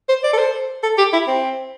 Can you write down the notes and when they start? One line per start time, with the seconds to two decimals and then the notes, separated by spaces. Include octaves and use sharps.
0.09 C5
0.24 D5
0.33 A4
0.38 C5
0.83 A4
0.98 G4
1.13 E4
1.27 C4